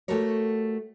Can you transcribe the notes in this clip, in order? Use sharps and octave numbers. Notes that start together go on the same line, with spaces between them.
A3 F#4 G4 A4 A#4 C#5